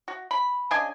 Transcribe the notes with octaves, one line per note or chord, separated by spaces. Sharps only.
F#4
B5
C#3 D4 D#5 G#5